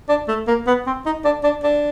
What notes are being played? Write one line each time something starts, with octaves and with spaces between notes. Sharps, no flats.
D4
A3
A#3
B3
C4
D#4
D4
D4
D4